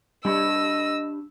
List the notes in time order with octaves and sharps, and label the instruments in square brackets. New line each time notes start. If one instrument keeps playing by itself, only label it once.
[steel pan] G3 [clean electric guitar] D4 G4 B5 [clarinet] D#5 [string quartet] E6